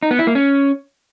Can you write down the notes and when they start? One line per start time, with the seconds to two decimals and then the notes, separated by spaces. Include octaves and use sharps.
0.03 D#4
0.11 B3
0.19 E4
0.27 A#3
0.35 C#4